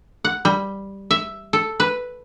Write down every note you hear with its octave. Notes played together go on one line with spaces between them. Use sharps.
F#5
G3
E5
A4
B4